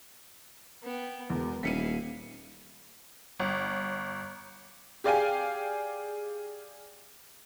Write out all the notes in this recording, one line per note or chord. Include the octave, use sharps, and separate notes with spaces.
B3 G5
E1 E2 A#4
D#1 E4 F5 B6 C#7 D#7
G1
G4 G#4 D5 F5 G5 G#5